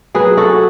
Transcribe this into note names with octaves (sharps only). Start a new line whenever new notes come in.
F#3 G#4 B4
F#4 A4